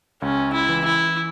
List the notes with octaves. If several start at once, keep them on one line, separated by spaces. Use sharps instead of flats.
C#2 C#4
E4
E3
E4